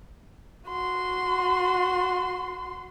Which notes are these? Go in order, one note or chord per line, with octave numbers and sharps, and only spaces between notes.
F#4 C6